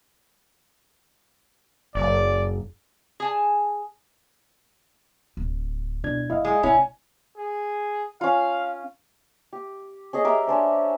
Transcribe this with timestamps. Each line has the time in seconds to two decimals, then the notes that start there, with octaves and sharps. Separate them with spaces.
1.95 F#1 F#2 D5
3.20 G#4 G#5 A5
5.37 D1
6.04 B2 D4 E4 G#6
6.30 F#1 E4 D#5 F5
6.45 G#3
6.63 G#1 C3 C#4 E4
7.37 G#4
8.21 C#4 F4 F5
9.53 G4
10.13 C#4 G#4 D#5
10.24 G4 A#4 E5
10.47 C#4 D4 C5